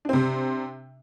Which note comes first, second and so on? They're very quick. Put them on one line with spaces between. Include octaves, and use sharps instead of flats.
D4 C4 C3